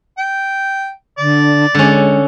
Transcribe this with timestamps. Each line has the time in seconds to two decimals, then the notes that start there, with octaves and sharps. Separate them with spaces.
0.18 G5
1.18 D3 D5
1.75 D3 G#3 C#4